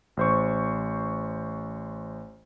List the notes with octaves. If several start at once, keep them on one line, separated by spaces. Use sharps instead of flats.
A1 C5 C#6